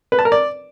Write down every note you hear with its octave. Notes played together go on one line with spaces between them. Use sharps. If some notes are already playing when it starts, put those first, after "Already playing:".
B4
A5
A#4
D5